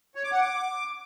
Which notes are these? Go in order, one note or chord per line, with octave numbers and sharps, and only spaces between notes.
C#5
D6
F#5
D6